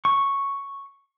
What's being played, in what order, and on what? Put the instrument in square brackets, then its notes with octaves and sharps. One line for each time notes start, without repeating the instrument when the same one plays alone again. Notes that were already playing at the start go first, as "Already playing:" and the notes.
[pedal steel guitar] C#6